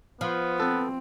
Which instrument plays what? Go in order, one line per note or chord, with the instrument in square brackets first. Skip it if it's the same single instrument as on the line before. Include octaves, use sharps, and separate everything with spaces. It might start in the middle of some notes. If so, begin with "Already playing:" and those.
[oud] F3 [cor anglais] B3
[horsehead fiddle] C4 [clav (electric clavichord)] A4 B4